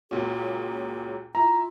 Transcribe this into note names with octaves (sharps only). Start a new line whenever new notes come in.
C#2 A#2 C#4 F4 F#4 G#4
E4 F4 A#5